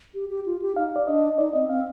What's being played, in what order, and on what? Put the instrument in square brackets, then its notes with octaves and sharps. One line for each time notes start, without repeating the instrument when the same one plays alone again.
[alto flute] G4
G4
F4
G4
[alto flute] D#4 [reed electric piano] F5
[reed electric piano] D5
[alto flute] D4 [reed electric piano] D#5
[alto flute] D#4 [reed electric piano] D5
[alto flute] C4 [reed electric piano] D#5
[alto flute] C4 [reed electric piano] F5